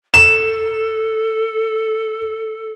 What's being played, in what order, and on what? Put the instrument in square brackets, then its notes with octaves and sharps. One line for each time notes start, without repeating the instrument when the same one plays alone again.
[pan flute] A4 [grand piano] E7